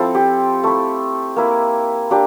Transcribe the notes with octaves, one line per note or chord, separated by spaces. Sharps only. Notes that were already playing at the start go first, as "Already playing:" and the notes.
Already playing: F3 C4 E4 A4
G4
A3 E4
A#3 E4
A#3 D4 G4